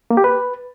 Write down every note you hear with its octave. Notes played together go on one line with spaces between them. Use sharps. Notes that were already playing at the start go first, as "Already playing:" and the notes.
A#3
G4
B4